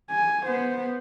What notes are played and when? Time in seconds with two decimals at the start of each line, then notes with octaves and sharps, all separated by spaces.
0.11 G#5
0.46 B3 C5